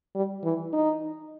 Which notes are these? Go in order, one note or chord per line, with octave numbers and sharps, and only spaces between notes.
G3
E3
D#4